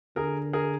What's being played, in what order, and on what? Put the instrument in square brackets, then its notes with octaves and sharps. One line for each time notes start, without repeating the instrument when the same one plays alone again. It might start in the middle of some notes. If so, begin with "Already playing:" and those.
[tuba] D3 [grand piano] G#4 A#4
[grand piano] G#4 A#4